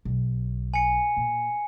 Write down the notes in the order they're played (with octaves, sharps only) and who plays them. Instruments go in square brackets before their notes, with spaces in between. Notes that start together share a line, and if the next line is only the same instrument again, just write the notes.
[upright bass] B1
[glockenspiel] G#5 C#7
[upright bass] A#2